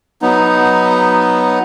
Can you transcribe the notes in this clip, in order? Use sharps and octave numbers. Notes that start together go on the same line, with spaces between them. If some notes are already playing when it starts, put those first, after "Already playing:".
F#3 B3 D#4